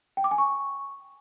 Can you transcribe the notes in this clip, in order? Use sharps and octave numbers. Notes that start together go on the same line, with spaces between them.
G5
D6
G#5
C#6